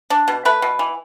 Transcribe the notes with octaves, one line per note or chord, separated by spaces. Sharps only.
D4
B2
A3 B4
B2
E3